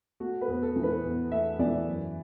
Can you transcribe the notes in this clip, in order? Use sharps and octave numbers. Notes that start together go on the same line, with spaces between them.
A3 F#4
B4
E2
A4
E3
B4
E2
A3 E5
E3 D5
F#2